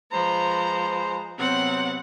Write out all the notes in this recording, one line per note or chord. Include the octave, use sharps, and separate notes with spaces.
F3 G#3 B4 C5 A#5
C3 F#3 B3 C4 F#5